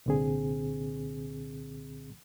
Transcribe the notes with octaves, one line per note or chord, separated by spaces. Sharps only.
C2 A#2 D3 C4 G#4